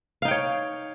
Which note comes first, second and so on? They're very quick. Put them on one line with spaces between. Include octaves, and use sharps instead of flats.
F5 D#4 G5 C#5